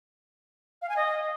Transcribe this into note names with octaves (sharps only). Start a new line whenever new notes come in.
F5
G#5
D#5